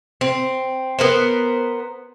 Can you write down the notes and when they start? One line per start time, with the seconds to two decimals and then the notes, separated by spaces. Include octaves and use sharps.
0.21 C4
0.99 B3 A#4 C5